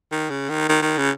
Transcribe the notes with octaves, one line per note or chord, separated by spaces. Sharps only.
D#3
C#3
D#3
D#3
D#3
C#3